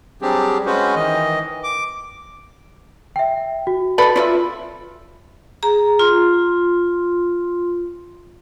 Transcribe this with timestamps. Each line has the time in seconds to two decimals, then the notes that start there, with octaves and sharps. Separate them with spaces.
0.22 F#3 G3 C4 D4 G4 G#4
0.66 G#3 C#4 F#4 B4 C5
0.95 D#3 E3 D#5
1.63 D6
3.16 E5 G5
3.67 F#4
3.98 B2 A4 B4 D5 B5
4.16 F4 B4 D5 E5
5.63 G#4 A#5
5.99 F4 C6